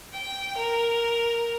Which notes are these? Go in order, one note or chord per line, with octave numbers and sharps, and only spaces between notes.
G5
A#4